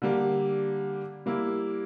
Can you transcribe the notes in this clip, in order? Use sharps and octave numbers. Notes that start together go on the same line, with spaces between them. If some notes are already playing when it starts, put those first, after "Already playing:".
D3 G3 A#3
G3 A#3 E4